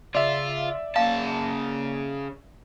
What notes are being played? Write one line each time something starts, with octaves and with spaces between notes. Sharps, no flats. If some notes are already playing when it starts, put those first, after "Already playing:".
C#3 F4 D5 E5
C#3 A#3 F5 A5